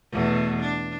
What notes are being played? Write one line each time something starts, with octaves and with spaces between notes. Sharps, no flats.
E2 B2 A3
D4